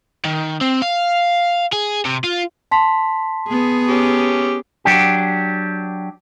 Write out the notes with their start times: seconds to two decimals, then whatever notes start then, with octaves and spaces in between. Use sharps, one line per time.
0.25 D#3
0.61 C4
0.82 F5
1.73 G#4
2.05 C3
2.24 F4
2.71 A5 C6 B6
3.49 B3 G#4
3.89 C#4 G4
4.85 F#3 D4 G4